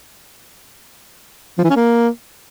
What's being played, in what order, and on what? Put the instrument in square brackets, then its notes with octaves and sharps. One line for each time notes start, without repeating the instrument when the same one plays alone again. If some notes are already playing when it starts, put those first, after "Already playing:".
[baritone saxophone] F3
E3
C#4
A#3